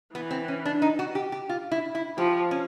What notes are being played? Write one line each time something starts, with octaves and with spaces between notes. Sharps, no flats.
E3 B3
C4
C#4
D4
D#4
F#4
G4
G4
F4
E4
E4
F3 G4
C#4